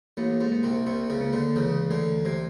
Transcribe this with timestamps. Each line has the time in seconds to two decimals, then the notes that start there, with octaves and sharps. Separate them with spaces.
0.17 A1 A2 A#3
0.41 G#2
0.52 A#3
0.63 C2 C3
0.86 C2 C3 A#3
1.10 C#2 C#3
1.21 A#3
1.33 D2 D3
1.56 C#2 C#3 E3
1.90 D2 D3 A3
2.25 C3 A3